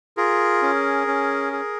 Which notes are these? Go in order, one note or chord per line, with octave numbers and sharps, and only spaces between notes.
F4 G#4 A#4
C#4
C#4
G#4